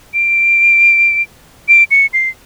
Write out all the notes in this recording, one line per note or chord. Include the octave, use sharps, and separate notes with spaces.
D7
D7
C#7
C7